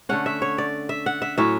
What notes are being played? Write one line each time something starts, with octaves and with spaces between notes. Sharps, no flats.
D3 A3 C#4 F#5
E5
C#5
D5
E5
F#5
E5
A2 F#3 C#4 E5